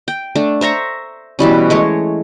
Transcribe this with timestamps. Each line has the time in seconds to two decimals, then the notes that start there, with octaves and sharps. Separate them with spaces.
0.08 G5
0.35 A3 D4
0.61 C5 E5 A#5 C#6
1.39 B2 E3 G3 C#4
1.70 G#3 A3 C#5